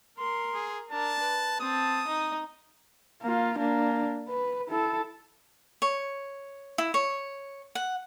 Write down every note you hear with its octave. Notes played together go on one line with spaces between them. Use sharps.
A#4 C6
G#4
D4 A#4 A5
B4
C4 A5 D#6
D#4 D#5
A#3 F4
A#3 D4
B4
E4 A4
C#5
E4
C#5
F#5